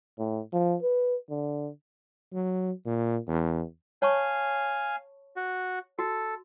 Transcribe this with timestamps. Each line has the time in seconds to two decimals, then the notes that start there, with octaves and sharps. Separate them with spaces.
0.19 A2
0.53 F3
0.83 B4
1.30 D3
2.33 F#3
2.86 A#2
3.28 E2
4.02 C#5 F5 G#5 A5 C#6
5.36 F#4
5.99 F#4 A4